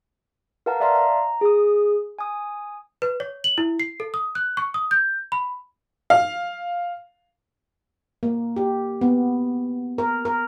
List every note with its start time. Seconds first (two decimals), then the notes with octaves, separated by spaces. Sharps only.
0.66 A#4 B4 F5 F#5 A5 A#5
0.80 D5 E5 F5 A5 A#5 C6
0.95 A#5
1.41 G#4 D#6
2.19 G#5 D#6
3.02 B4
3.20 C#5
3.44 F#7
3.58 E4
3.80 C7
4.00 A4
4.14 D#6
4.35 F#6
4.57 C#6
4.74 D#6
4.91 G6
5.32 B5
6.10 F5
8.23 A#3
8.56 G4
9.01 B3
9.98 A#4
10.25 A#4